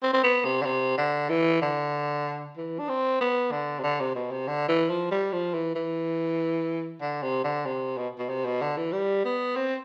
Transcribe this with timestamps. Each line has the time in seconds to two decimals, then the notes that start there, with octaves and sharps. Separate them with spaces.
0.03 C4
0.13 C4
0.23 B3
0.44 C3
0.61 D3
0.65 C3
0.97 D3
1.29 E3
1.62 D3
2.57 E3
2.79 D4
2.89 C4
3.21 B3
3.52 D3
3.79 C3
3.83 D3
4.00 C3
4.15 B2
4.31 C3
4.48 D3
4.68 E3
4.90 F3
5.11 G3
5.32 F3
5.54 E3
5.75 E3
7.01 D3
7.22 C3
7.44 D3
7.65 C3
7.97 B2
8.19 B2
8.29 C3
8.45 B2
8.61 D3
8.77 E3
8.92 G3
9.25 B3
9.56 C4